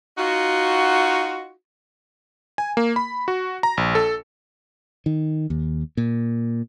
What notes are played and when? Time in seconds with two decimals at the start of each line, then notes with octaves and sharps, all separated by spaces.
0.18 D#4 F4 F#4
2.58 G#5
2.77 A#3
2.96 B5
3.28 F#4
3.63 A#5
3.77 A#1
3.95 A4
5.06 D#3
5.50 D#2
5.97 A#2